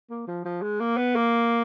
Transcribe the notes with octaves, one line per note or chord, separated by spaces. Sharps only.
A#3
F3
F3
G#3
A#3
B3
A#3